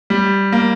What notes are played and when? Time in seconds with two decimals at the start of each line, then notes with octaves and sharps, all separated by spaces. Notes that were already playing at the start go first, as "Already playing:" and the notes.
0.10 G3
0.52 A#3